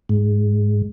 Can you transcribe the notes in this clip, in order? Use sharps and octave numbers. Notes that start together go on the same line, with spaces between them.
G#2